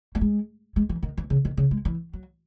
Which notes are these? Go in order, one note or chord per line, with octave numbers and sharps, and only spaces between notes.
A3
G#3
G#3
E3
D#3
E3
C#3
D#3
C#3
G#3
E3
F#3